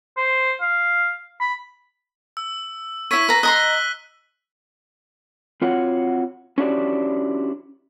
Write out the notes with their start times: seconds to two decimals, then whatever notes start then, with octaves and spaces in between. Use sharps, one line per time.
0.17 C5
0.61 F5
1.41 B5
2.37 E6
3.11 E4 C#5 E6 B6 D#7
3.29 B4 A#5
3.43 D#5 A#5 C6 F#6 G7
5.62 C4 F4 F#4 C#5 F#5
6.58 C#4 D4 E4 F#4 G4 D5